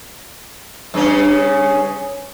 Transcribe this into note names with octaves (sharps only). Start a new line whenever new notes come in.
G2 C#3 C#4